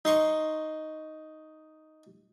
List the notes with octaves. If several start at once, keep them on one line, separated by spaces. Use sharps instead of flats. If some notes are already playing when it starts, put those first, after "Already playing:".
D#4 C6 C#6